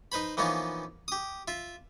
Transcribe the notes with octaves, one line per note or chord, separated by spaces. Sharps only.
D#4 B4 C5 B5
E3 F3 A#3 B3 C#4 D#4
G4 D#6
F4 E5